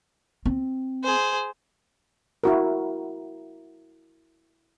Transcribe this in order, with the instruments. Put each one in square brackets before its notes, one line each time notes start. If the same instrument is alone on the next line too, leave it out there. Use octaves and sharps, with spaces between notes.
[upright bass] C4
[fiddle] G#4 C5
[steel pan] E4 F#4 A#4